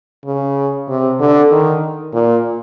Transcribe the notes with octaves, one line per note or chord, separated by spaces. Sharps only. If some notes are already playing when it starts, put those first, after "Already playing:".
C#3
C3
D3
D#3
A#2